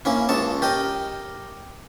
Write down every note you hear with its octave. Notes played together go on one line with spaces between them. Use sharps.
A#3 C#4 E4
C#2 C#5 A5
G4 A#4 D#5